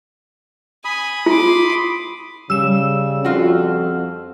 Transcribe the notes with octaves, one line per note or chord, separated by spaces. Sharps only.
G#5 B5 D#6
F4 C6 D6
C#3 G3 E6 E7
F2 F4 F#4